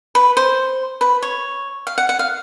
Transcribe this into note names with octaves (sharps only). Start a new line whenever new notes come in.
B4
C5
B4
C#5
F5
F#5
F#5
F5